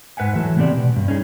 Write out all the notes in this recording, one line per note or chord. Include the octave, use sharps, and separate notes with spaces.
G#2 B4 E5 F#5 G#5
E3 F#3 A3
A2 C3 B3 C4 G4 D5
B2
G2
C#4 D#4 G#4